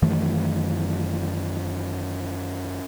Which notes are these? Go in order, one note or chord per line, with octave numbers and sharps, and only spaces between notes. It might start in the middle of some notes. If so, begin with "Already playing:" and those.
F#2 D#3 E3 A3